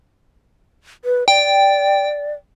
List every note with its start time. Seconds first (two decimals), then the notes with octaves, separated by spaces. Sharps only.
1.05 B4
1.28 D5 G5